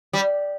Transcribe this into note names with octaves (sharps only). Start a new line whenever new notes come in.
G3